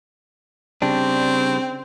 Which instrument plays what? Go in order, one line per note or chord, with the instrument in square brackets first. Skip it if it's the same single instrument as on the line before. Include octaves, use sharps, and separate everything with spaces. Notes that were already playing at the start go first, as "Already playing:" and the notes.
[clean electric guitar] C#3 G3 D4 [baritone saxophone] C4